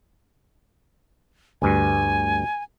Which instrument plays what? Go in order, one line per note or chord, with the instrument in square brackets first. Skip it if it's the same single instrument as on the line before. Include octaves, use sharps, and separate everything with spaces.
[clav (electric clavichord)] D2 G2 [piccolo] G#5